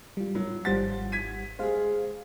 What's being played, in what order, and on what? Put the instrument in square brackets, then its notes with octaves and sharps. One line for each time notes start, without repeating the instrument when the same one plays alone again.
[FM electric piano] G3 F4
[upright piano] F#3
[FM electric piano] G#1 G3 F#5 [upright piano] F3 C5 A6
[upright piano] G#6 B6 D#7
[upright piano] G#3 G#4 [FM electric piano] C5 F5